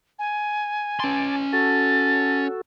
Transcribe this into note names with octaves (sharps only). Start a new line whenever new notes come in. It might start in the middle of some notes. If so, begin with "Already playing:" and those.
G#5
C#4 A5 C6 D6
F#4 A4 A6